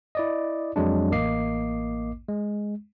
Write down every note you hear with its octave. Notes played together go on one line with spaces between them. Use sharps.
E4 D5 D#5
F2 F#3 G#3 D4
A1 A#3 D#5 D6 C7
G#3